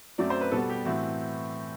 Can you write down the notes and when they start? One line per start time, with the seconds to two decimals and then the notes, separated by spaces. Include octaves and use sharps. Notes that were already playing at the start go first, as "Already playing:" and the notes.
0.18 F#2 F#3 A3 C4 D5
0.30 C5
0.41 B4
0.52 B2 G3 B3 A4
0.70 G4
0.85 A2 E3 A3 C4 F#4